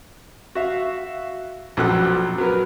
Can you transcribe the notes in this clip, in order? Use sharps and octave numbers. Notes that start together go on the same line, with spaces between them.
F#4 E5 F5
A#1 F#2 B2 A4 F#6
F#3 B3 A#4 B4